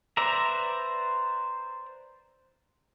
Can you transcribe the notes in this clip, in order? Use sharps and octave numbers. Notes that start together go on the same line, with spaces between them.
B4 C5 D5 E5 A#5